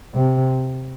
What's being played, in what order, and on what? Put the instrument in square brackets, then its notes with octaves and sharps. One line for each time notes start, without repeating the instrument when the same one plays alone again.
[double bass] C3